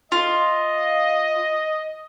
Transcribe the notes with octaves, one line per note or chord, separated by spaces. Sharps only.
F4 D#5